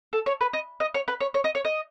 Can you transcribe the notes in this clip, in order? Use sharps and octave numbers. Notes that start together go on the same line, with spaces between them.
A4
C#5
B4
D#5
D#5
C#5
B4
C#5
C#5
D#5
C#5
D#5